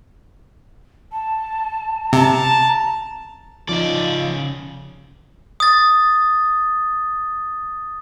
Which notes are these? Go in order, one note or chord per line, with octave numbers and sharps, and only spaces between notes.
A5
C3 A5 A#5
C#3 F3 C#4 D#4 D5
D#6 A6